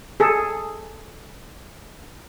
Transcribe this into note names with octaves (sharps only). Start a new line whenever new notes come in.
G#4 A4